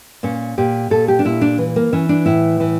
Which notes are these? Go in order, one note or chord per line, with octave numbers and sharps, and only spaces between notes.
A#2 C#4
A#2 G4
A#2 A4
G4
D4
A#2 E4
D4
E3
A#3
E3 C#4
D4
A2 E4
E3